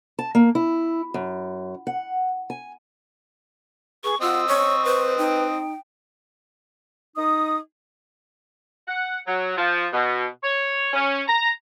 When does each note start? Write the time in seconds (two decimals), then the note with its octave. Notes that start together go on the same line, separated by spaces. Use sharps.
0.19 A5
0.35 A#3
0.55 E4
1.14 F#2
1.87 F#5
2.50 G#5
4.04 G#4 B4 C#6
4.21 C4 F4 D#5 F#5 E6
4.48 C#5 C#6
4.85 B4 C5
5.18 D#4 G5
7.17 D#4 D#6
8.88 F#5
9.27 F#3
9.57 F3
9.93 B2
10.43 C#5
10.94 C#4
11.28 A#5